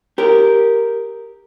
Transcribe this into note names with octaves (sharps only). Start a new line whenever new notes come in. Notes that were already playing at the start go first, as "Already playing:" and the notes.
G4 A#4